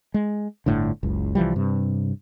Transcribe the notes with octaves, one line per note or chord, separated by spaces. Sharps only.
G#3
G1 A2 D3
F#1 C#2
C2 E3 F3 G3
G2 C3